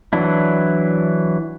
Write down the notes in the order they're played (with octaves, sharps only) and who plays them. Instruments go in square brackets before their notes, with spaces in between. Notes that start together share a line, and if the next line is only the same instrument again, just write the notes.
[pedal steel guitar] E3 F#3 D4 E4